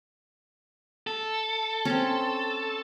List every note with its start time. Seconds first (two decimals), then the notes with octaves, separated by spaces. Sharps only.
1.07 A4
1.85 C4 C#4